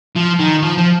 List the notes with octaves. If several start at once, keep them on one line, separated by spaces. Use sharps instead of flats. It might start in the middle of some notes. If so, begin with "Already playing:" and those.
F3
D#3
F3
F3